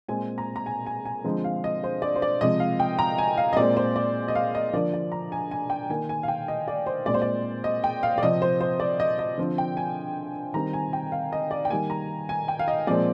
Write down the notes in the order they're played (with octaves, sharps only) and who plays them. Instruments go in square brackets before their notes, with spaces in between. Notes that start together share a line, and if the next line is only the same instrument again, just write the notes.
[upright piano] A#2 G#3 C4 G#5
A#5
A#5
G#5
G#5
G#5
D3 F3 G#3 C4
F5
D#5
C5
D5
C5
D5
C3 F3 G#3 D#5
F5
G5
A#5
G#5
F5
D#5
A#2 G#3 C4 D5
C5
D5
D#5
F5
D#5
D3 F3 A#3 D5
D5
A#5
G#5
G#5
G5
D#3 A#3 G#5
G#5
F5
G5
D#5
D5
C5
A#2 G#3 C4 D5
C5
D5
D#5
G5
F5
D5
C3 F3 C4 D#5
C5
C5
D5
D#5
D#5
D3 F3 C4
G5
G#5
D#3 G3 C4 A#5
G#5
G5
F5
D#5
D5
G5
D#3 G3 A#3 G#5
A#5
G#5
G5
F5
D#5
A#2 F3 G#3 C4 D5